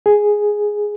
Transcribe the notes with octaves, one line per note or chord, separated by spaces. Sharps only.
G#4